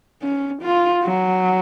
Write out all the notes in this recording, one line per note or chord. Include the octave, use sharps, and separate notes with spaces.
C#4
F4
F#3